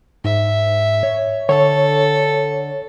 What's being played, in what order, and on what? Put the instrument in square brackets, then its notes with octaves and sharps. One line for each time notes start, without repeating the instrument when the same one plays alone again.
[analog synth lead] G#2 [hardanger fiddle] E5
[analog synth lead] C#5
[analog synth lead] D3 [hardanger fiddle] A4 [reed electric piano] C#5